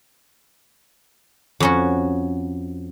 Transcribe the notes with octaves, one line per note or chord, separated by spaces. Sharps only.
F2 C#4 F#4